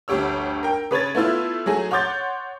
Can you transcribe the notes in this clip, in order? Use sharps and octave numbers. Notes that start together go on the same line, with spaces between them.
G1 D2 G4 C#5 E6
A#4 G5
C#3 B4 C#5 G#6 A6
A3 B3 E4 F4
F#3 A3 G#4
C#5 F#5 C6 D6 G6 A6